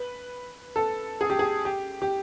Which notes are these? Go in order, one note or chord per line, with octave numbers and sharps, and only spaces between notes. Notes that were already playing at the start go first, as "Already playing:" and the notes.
Already playing: B4
A4
G#4
G4
G#4
G4
G4